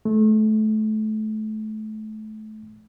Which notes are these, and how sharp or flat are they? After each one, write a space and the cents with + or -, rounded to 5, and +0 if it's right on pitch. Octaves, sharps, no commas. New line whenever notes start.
A3 -30